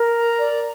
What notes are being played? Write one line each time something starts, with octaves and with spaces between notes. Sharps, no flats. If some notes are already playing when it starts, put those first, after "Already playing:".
Already playing: A#4
A#5
D5